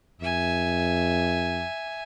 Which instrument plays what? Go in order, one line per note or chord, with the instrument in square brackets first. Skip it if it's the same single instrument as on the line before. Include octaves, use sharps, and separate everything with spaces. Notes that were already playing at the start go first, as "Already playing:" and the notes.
[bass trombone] F2 [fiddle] E5 G#5